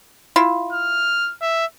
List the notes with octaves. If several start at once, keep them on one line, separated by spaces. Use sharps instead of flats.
E4 F4
F6
E5